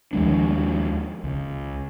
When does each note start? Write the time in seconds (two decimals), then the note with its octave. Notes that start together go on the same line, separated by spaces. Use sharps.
0.13 D#2 F3 G#3 D4
1.24 C#2